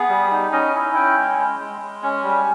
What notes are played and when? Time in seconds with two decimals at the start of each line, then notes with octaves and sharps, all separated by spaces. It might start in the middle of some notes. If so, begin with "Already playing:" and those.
Already playing: B3 G#4
0.09 G3
0.31 D#4
0.52 C#4 D#5
0.74 E4
0.95 C#4 G5
1.17 G#3
1.38 G#3
1.60 G#3
1.81 G#3
2.03 C#4
2.24 G3